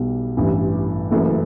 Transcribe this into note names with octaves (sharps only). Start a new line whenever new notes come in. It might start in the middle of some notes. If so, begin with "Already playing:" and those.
Already playing: B1 B2 G3
A1 G2 E3
F#1 F#2 C#3 E3 A3